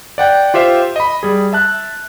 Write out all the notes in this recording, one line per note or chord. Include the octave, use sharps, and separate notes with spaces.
D5 F#5 G5
F4 G4 C5 E5
D#5 B5
G3 G#4
E5 A5 F#6